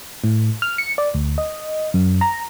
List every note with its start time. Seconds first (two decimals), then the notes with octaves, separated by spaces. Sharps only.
0.24 A2
0.62 F6
0.78 C#7
0.98 D5
1.14 D2
1.38 D#5
1.94 F#2
2.21 A#5